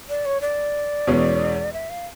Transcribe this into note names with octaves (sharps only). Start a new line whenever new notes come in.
D5
C#5
D5
E2 B2 G#3 C#4
E5
F5